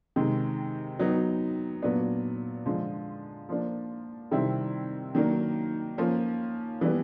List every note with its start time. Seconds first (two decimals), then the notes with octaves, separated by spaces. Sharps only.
0.16 C3 D#3 G#3
0.99 F#3 B3 D#4
1.82 A#2 F#3 B3 D4
2.66 D3 F3 G#3
3.49 F3 A#3 D4
4.31 C3 D#3 G3 C4 E4
5.15 D#3 F#3 A#3 D4
5.98 F3 A#3 C#4
6.81 E3 G3 B3